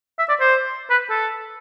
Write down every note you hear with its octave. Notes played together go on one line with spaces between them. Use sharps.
E5
D5
C5
B4
A4